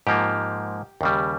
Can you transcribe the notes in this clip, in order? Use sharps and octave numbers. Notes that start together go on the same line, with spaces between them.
G#2 F3 A#3 G4
D#2 C#3 G3